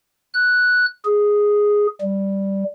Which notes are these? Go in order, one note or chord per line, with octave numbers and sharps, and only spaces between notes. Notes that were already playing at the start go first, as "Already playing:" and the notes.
F#6
G#4
G3